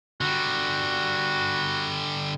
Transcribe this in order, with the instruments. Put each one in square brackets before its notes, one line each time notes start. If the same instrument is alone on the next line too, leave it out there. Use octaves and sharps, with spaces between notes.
[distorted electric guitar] D3 G3 [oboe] F#4